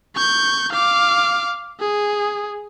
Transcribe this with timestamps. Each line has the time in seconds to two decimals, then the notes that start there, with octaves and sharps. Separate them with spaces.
0.15 C#6 G6
0.72 F5 D6
1.80 G#4